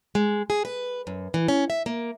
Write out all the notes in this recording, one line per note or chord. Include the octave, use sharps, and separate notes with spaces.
G#3
G#4
B4
F#2
E3
C#4
E5
A#3